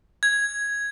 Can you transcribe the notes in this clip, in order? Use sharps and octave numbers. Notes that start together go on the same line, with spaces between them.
G#6